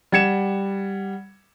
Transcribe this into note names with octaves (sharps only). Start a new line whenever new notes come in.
G3 F#5 G#6 C#7 E7